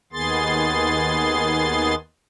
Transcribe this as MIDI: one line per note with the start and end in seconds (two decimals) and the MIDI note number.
0.13 1.95 39
0.13 1.95 51
0.13 1.95 59
0.13 1.95 68
0.13 1.95 84
0.13 1.95 93